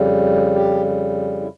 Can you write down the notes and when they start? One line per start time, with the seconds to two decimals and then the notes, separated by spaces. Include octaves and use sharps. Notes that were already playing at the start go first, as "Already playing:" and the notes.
Already playing: F2 C#3 G3
0.54 G4
1.41 E4